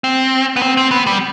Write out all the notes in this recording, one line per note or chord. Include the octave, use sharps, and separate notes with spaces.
C4
B3
C4
C4
B3
G3